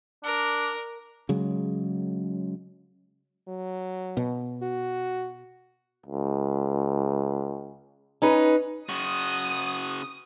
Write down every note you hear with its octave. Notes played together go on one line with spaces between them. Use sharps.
D4 A#4
C#3 F#3 G#3
F#3
B2
F#4
C#2
C#4 D#4 B4
C#3 F#4 D#6